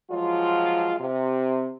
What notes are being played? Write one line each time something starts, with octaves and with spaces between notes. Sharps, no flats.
F3 F#3 G#3 F4
C3